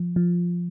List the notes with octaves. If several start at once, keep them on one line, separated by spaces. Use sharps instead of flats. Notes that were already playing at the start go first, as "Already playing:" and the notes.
Already playing: F3
F3